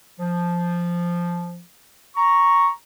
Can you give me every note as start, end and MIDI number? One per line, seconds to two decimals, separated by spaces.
0.19 1.60 53
2.17 2.69 82
2.17 2.72 85